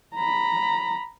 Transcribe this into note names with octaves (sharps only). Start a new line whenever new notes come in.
A#5 B5